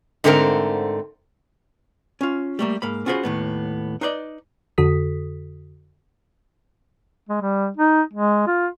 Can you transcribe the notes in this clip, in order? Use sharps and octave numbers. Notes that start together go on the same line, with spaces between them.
G#2 D3 A3 C4 G#4 A#4
C#4 F4
G3 A3 A#3
G#2 A#3 B5
C#4 F4 F#4 G#4 C5 B5
D#2 A2 B3
D#4 B4 C5 D5 D#5
F2 D3 F#4 A4 D#6 B6
G#3
G3
D#4
G#3
F4